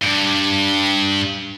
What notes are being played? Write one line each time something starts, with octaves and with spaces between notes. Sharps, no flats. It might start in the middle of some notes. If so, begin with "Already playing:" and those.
G2